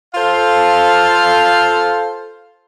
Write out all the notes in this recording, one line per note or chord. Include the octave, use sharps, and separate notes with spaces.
F4 A4 C5 F5